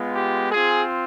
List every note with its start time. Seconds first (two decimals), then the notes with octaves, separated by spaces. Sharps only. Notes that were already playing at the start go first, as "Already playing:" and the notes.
Already playing: G#3 B3 F4
0.15 G4
0.50 C4 F4 G#4